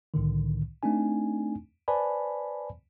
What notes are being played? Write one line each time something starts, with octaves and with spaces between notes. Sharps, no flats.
C2 A2 D3 D#3
A3 C4 D4 D#4 G#5
B4 C5 D5 G#5 A5 B5